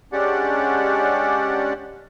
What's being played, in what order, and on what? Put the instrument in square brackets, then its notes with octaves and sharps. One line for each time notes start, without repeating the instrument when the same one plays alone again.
[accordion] G#3 C#4 D4 G4 D5 F#5